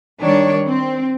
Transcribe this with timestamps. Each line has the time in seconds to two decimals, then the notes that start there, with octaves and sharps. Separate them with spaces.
0.22 D#3 G3 D4 C#5
0.66 C4